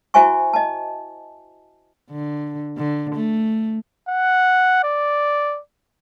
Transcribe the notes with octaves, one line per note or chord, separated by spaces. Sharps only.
E4 F#4 C5 E5 G#5 C#6
D#5 A5
D3
D3
A3
F#5
D5